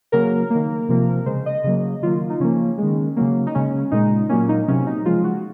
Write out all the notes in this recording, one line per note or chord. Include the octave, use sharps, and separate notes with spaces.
C#3 F#3 A#3 A#4
D#3 A#3
C3 F3 A#3
C#3 G#3 C5
D#5
C#3 F#3 A#3
D#3 F#3 A#3 F4
D#4
C#3 F3 A#3 C#4
D#3 G#3
C#3 F#3 A#3
D#4
C#3 G#3 C#4
A#2 G#3 D#4
A#2 F#3 A#3 C#4
D#4
C3 F#3 A#3 C#4
D#4
C#3 F3 G#3 F4
F#4